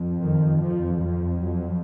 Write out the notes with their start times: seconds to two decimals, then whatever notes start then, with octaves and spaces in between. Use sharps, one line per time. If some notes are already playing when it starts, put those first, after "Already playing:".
Already playing: F2
0.23 D#3
0.62 F3
1.01 F3
1.39 F#3